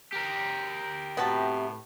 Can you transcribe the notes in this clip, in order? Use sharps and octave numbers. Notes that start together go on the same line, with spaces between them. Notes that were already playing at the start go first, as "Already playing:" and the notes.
G4 A#4
A2 C3 B3 F#4 A5